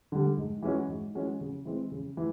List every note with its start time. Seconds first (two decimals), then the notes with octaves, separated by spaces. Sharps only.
0.12 D3 G3
0.37 G#2
0.62 E3 G#3 C#4 F#4
0.88 G#2
1.15 E3 G#3 C#4 F#4
1.41 C#3
1.65 E3 G#3 C4
1.92 C#3
2.17 E3